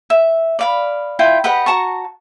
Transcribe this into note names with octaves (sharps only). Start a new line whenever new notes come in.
E5
D5 F5 B5
E4 F4 G5
G4 B4 D#5 F#5
F#4 A5 A#5 C#6